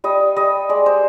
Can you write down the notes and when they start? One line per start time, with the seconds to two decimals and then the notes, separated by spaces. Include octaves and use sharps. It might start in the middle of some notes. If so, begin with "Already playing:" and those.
0.04 G3 D#5
0.36 G3 D#5
0.69 G#3 D5
0.86 C5